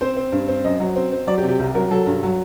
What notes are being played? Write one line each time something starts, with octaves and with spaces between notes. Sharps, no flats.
C4 C5
C4
G2
C4
F#2 D#5
F#3
C4
C4
F#3 D5
G4
C3
G4
C2 G4
F#3 A#4
F#3 A4
G2
F#3